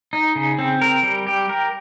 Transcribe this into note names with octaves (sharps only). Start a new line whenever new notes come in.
D#4
C#3
C4
A#4
G3
G4
A#4